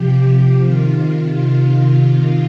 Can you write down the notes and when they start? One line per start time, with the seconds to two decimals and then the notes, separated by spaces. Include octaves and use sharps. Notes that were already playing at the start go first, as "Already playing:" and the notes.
Already playing: C3 F3 G4
0.60 C3 D#3 F4